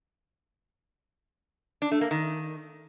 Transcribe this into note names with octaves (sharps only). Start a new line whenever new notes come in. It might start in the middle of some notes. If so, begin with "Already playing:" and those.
D4
A3
A#3
D#3